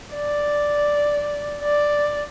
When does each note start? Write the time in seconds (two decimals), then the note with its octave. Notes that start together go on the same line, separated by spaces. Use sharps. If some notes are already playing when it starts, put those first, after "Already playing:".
0.15 D5
1.62 D5